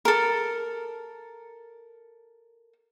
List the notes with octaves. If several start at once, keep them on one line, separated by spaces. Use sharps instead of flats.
A4 A#4